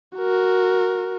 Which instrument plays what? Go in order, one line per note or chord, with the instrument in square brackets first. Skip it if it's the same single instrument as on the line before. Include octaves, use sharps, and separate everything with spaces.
[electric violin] F#4 A#4